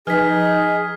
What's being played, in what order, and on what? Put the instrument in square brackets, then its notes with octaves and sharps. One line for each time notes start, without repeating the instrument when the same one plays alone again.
[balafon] F3 B4 G#5 [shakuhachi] D#4 [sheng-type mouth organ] G#4 [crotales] F6 B6